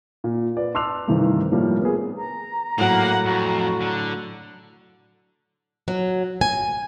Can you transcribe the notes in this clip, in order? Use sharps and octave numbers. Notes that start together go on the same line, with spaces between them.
A#2
B4 D5
A5 C6 D6 E6 F#6 F7
G2 C3 D#3 E3 G3 A3
A2 F3 G3 A#3
B3 G#4
A#5
A2 F#3 A#3 F#5
F2 F#4
D3
F#3
G#5